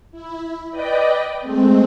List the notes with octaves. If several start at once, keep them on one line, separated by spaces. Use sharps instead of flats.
E4
B4 D5 D#5 G5
G#3 A3 C4